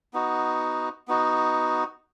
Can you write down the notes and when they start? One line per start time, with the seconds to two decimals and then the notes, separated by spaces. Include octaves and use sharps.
0.13 B3 D#4 F#4
1.08 B3 D#4 F#4